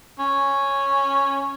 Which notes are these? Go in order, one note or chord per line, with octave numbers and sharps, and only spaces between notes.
C#4